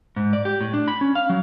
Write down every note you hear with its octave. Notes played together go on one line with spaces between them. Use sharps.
G#2
D5
G4
A2
D4
B5
C#4
F5
F#3